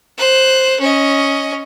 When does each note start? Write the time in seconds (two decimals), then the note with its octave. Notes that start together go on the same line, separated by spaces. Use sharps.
0.17 C5 F#6
0.80 C#4 D#5